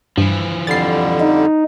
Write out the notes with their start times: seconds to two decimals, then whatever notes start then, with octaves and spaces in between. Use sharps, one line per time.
0.18 G2 E3 F3
0.67 F2 D3 G3 A6 C7
1.20 D#4